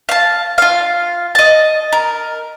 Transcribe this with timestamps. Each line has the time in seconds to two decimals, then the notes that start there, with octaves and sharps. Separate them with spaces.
0.09 F5 A5
0.58 F4 F5
1.35 D#5 A5
1.93 A#4